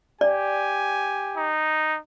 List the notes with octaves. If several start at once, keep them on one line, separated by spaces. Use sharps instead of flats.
G4 D5 G#5
D#4